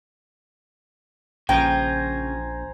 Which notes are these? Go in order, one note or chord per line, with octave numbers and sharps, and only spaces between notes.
A#1 C#3 F3 C5 G5 G#5 A#5